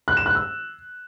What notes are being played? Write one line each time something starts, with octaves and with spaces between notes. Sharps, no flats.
F#6
E7
F#6
E6